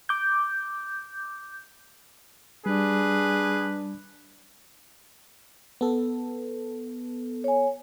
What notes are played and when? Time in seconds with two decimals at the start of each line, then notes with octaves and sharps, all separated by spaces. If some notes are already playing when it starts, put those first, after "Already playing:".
0.09 D6 G6
2.66 G3 D4 G#4 B4
5.81 B3 A4
7.44 C#5 G#5